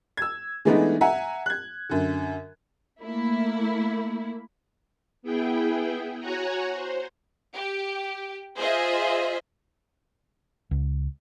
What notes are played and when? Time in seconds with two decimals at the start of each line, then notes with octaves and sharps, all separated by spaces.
0.17 E6 G#6
0.65 E3 G#3 A3 B3 D4 D#4
1.01 E5 F#5 G#5 A#5
1.46 F#6 G#6
1.89 F#2 D3
3.02 A3 A#3 E4
5.23 B3 E4 G#4 G5
6.19 F#4 C#5 F#5 G#5 A#5
6.74 C5
7.56 G4
8.57 F4 G#4 C5 D#5 E5
10.71 C#2